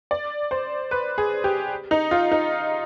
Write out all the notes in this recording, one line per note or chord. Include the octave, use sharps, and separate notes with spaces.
D5
C5
B4
G#4
G4
D#4
F4
D#4